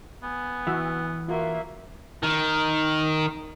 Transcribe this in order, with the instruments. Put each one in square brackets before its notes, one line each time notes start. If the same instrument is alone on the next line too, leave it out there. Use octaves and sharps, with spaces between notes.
[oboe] B3 [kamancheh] G#5
[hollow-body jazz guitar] E3 [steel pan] F#4 E5
[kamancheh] A#3 E5 [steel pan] F4 F#4
[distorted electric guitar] D#3